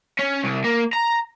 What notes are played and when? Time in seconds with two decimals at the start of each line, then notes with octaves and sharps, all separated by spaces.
0.19 C#4
0.43 C2
0.64 A#3
0.93 A#5